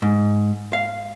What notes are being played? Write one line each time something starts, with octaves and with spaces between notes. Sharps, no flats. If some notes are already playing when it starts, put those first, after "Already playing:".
G#2
F5